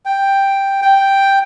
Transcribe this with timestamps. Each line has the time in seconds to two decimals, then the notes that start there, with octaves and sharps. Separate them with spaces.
0.06 G5
0.82 G5